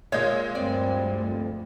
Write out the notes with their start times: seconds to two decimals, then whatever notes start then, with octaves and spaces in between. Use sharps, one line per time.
0.12 A#2 G#3 C#5 D#5 F5
0.55 D2 G2 C4 D5
1.25 F2